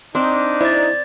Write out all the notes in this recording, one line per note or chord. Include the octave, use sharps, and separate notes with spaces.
C4 D4 D#4
E4 C5 D5 A6